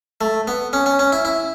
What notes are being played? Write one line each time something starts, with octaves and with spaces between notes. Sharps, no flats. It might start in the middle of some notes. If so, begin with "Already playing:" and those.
A3
B3
C#4
C#4
C#4
E4
E4